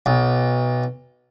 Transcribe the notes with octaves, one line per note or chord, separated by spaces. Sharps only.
B1